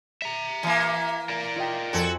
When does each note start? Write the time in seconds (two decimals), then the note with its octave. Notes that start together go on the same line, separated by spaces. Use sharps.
0.22 E5 A#5
0.63 E3 A#3
1.29 A#4 D5 E7
1.56 F4 D#5 G5
1.93 F2 F#4 A4 G#5